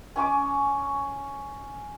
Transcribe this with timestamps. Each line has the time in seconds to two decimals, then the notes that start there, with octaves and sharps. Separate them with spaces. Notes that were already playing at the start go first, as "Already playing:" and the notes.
0.16 C#4 G#5 C#6 D6